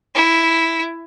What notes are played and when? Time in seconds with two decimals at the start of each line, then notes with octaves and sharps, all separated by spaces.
0.15 E4